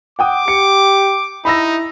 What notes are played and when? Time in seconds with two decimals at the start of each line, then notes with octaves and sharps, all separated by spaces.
0.19 F#5 G5 D6 D#6
0.48 G4 C#7
1.45 D#4 E4 B5 E6 A#6